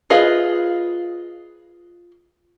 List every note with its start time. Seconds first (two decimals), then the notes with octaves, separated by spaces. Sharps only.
0.10 F4 G#4 B4 D#5 F5